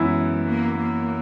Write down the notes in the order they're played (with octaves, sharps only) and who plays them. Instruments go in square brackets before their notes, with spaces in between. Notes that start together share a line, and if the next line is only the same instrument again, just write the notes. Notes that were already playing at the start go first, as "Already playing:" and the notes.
Already playing: [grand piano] F#2 E3 B3 E4 B4 [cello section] G#3
[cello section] A#3
A#3